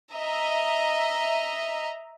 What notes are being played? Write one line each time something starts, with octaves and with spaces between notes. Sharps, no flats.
D#5 E5 A#5